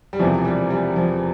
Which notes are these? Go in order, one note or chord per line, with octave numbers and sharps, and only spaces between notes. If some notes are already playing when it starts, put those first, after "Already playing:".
G3
E1 E2 C3 E3 F3
G3
G3
F3